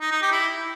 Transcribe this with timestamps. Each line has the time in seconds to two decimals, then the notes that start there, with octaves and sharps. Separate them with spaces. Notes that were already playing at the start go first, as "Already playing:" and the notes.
0.01 D#4
0.11 D#4
0.22 G4
0.32 E4